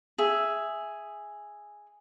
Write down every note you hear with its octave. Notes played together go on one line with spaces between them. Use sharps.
G#4 E5